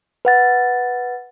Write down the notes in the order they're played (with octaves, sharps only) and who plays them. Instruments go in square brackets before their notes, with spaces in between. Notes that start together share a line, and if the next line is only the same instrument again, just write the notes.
[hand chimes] B4 F#5 A6